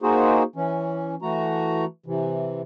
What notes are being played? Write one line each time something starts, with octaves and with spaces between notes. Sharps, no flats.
A#3 D#4 F#4 G#4 C5
E3 C#4
E3 A3 F#4 A#5
C3 E3